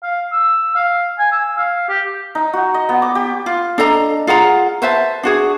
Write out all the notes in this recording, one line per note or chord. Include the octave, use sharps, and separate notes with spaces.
F5
E6
F5
G#5
E6
F5
G4
D#4
F#4
D#5
B3
D6
G4
F4
D4 A4 D#5 A#5
F4 G#4 F#5 A#5
B4 C5 E5 A5
D4 F#4 G#4